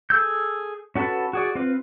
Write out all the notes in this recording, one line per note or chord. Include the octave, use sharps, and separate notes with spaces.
G#4 A4 E6 G6
C#4 F#4 A4 B4 A5
F#4 G#4 D5
C4 F4 B4